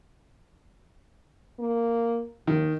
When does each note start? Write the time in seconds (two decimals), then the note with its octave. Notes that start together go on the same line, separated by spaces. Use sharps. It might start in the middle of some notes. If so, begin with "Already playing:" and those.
1.59 A#3
2.47 D#2 D#3